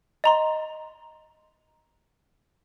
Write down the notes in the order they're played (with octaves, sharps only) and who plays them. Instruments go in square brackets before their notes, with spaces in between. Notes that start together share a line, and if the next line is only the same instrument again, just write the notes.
[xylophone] D#5 A#5 C6